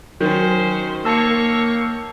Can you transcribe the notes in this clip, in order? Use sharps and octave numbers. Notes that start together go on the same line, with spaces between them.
D#3 F#3 C#4 C5
A#3 C#5 A5 C#6 E6